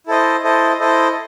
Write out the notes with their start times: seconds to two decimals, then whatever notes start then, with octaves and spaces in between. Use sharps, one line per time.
0.07 E4 A4 C5 D#5
0.44 E4 A4 C5 D#5
0.79 E4 A4 C5 D#5